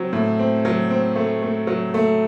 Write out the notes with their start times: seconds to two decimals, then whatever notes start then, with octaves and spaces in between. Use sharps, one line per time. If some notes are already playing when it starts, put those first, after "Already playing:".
Already playing: F#3 C4
0.13 A2
0.39 C4
0.65 F#3
0.90 C4
1.16 A3
1.43 A3
1.67 F#3
1.94 A3